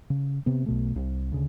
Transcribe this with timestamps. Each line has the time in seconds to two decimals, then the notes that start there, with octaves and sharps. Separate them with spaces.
0.10 C#3
0.46 C3 B3
0.66 B1 B2 A3
0.96 C2
1.32 D2 C#3